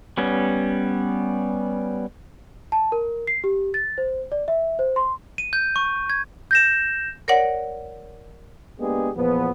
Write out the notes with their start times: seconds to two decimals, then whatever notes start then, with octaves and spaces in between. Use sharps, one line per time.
0.18 G3 B3 C#4
2.72 A5
2.92 A#4
3.27 C7
3.44 G4
3.74 A6
3.98 C5
4.32 D5
4.48 E5
4.79 C5
4.96 C6
5.38 D#7
5.53 G6
5.76 C#6
6.10 G#6
6.51 G6 A#6 E7
7.28 A#4 C#5 D5 F#5
8.80 G#3 A#3 B3 D4 G4 G#4
9.16 E2 A#2 F3 B3